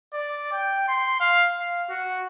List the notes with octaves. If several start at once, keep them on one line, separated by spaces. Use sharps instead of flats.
D5
G5
C6
F5
F5
F#4